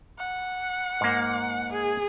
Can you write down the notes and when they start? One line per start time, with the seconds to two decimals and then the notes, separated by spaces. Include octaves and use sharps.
0.19 F#5
1.01 G#2 A#3
1.72 G#4